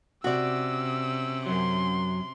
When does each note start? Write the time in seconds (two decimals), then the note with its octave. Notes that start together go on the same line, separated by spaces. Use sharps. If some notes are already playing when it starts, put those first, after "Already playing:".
0.24 C3 C#4 F#4 D5 E6
1.46 F#2 F#3 C6